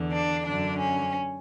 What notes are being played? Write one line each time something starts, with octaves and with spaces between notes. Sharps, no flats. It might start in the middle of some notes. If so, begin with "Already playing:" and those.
Already playing: E2 D3
D4
F#2 D3 D4
C#4